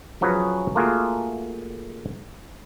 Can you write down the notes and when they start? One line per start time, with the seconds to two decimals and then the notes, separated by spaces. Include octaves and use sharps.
0.21 F3 F#3 C#4 F#4 G#4 B4
0.75 A3 A#3 F4 F#4 G#4